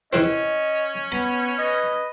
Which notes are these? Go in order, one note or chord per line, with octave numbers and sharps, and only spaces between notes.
C3 E3 C4 C#4 D#5
B3 A#5
B4 D#5